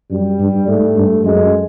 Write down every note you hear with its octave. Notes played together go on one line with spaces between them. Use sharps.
F#2 G3
G2
G#2 A3
G2
F#2 G#3